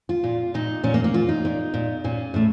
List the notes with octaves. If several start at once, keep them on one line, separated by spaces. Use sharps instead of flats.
F4
A#2
A#2 D#4
A#2 C#4
A#3
A#3
A#2 F4
D#4
A#2
A#2
A#2 C#4
A2 A3